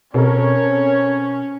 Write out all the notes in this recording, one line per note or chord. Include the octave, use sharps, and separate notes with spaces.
B2 C4 C#4 A4 A#4 C#5